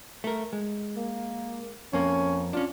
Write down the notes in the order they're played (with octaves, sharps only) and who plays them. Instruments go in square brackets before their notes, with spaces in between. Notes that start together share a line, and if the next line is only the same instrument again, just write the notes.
[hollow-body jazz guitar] A3 A#4
G#3
[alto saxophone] A#3
[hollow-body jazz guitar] F2 A#3 [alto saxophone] C#4
[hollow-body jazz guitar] C#4 D4 [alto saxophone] F4